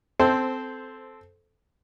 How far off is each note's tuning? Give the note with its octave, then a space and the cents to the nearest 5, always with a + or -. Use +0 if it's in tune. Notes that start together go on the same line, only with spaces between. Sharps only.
C4 -15 A4 -10 C5 +0